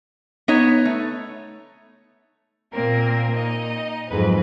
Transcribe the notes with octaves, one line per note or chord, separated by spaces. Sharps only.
B3 D#4 C#5
A3
A#2 A#3 C4 A#4
D#4 D#5
F2 G#2 F#3 B4